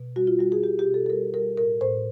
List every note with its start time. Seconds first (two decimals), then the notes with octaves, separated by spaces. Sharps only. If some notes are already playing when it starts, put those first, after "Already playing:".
Already playing: B2
0.16 G3 F#4
0.27 F4
0.39 G3 F#4
0.52 G#4
0.63 B2 G4
0.79 G4
0.87 B2
0.94 A4
1.06 A4
1.10 G3 A#4
1.34 G3 A#4
1.57 A2 A#4
1.81 A2 C5